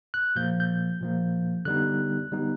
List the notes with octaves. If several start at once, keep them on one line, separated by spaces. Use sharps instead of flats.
F#6
A#2 F3 A#3 G6
G6
A#2 F3 A#3
D3 G3 B3 D#4 F#6
D3 G3 B3 D#4